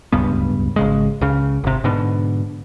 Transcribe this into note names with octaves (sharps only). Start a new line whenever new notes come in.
D1 C#2 G2 B3
G#1 C#3 G#3
C#2 C#3
G#1 C3
G#2 B2 D3